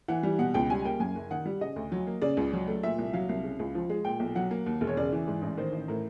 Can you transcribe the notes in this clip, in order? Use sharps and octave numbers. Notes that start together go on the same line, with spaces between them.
E3 F#5
G3
B2 F#5
C#2 G5
G3 G#5
A#3 G5
F#2 G#5
F#1
D#3 F#5
G3
C#3 D#5
D2
F#3
A#3
C#3 D5
C#2
F#3
A3
A#2 E5
C2
F#3 F5
C2
C#3
C#2
F3
G#3
A#2 G5
B1
F#3 F#5
A#3
D#2
E1
C#5
C#3 D5
E3
G#2
A1
D#3 C5
A1
A2 A#4